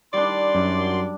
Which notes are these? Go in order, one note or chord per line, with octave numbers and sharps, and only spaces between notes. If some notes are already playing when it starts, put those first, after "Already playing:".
D#3 G3 D4 D5 C6
F#2